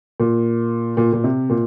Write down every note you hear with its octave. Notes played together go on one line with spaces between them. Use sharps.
A#2
A#2
A#2
C3
A#2